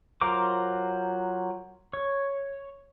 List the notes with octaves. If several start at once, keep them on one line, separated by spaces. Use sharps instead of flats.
F#3 F4 A#4 C5 D6
C#5